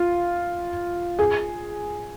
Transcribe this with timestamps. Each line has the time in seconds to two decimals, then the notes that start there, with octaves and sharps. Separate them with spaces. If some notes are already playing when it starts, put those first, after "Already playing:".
Already playing: F4
1.19 G#4